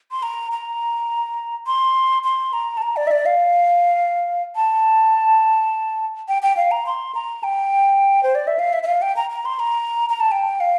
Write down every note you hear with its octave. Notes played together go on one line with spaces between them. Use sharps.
C6
A#5
A#5
C6
C6
A#5
A5
A#5
D5
E5
D5
F5
A5
G5
G5
F5
A#5
C6
A#5
G5
C5
D5
E5
F5
E5
E5
F5
G5
A#5
A#5
C6
A#5
A#5
A5
G5
F5